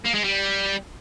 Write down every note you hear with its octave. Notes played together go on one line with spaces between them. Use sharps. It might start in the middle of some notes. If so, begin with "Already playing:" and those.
A#3
G#3
G3